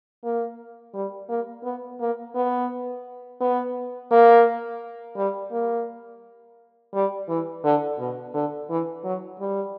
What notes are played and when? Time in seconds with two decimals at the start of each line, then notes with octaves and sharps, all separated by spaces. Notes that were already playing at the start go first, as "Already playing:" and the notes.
0.24 A#3
0.94 G3
1.29 A#3
1.64 B3
2.00 A#3
2.35 B3
3.40 B3
4.11 A#3
5.16 G3
5.52 A#3
6.93 G3
7.29 E3
7.64 D3
7.99 B2
8.34 D3
8.70 E3
9.04 F#3
9.40 G3